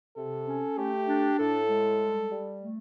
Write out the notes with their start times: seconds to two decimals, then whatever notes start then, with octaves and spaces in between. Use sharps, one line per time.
0.16 C3 A4
0.47 C#4
0.78 A3 G4
1.08 D4
1.39 A2 A4
1.69 G#3
2.00 G3
2.32 G3
2.62 A3